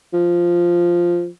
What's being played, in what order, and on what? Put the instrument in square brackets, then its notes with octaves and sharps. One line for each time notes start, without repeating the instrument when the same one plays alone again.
[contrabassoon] F3